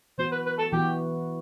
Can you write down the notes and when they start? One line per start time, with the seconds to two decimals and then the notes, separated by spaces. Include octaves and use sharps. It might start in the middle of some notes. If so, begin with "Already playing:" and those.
0.18 E3 B3 F#4 C5
0.32 B4
0.45 B4
0.59 A4
0.72 E3 B3 F#4 G4